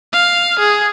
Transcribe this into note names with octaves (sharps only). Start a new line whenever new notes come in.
F5
G#4